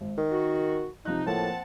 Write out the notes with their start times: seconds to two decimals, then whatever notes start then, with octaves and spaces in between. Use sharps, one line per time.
0.01 G#1
0.18 D#3 A#4
0.31 F#4
1.05 C3 F3 D#4 F#6
1.26 A2 F3 A#3 C4 F#5 A5